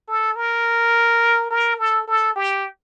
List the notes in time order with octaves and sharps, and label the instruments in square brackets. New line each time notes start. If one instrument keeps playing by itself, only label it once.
[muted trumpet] A4
A#4
A#4
A4
A4
G4